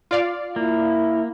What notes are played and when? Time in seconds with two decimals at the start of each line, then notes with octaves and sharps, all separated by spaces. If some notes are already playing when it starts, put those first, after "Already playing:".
0.11 F4 D5 F5
0.56 A#3 E4